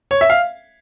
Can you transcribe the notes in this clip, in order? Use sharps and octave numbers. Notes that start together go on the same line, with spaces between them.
C#5
E5
F5